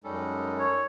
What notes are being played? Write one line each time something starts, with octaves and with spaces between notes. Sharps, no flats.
F#2 G3 G#3 C#4 D#4 A4
C#5